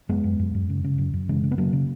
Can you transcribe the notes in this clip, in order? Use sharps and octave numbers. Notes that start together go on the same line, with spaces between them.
F#2 G#3 B3
F#2
F#2
F#2
C#3
C#3
F#2
F#2
C#3 E3 G#3
C#3
B3
C#3 F#3 A#3
C#3